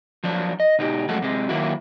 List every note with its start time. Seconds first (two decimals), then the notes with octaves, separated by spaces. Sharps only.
0.24 F3 F#3 D4
0.60 D#5
0.79 B2 D#4 G4
1.09 F#2 F3 G#3 A3 F#4
1.22 C3 G#3
1.49 D#3 F#3 A#3 E4 F#4